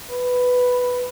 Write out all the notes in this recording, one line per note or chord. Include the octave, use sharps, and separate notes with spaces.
B4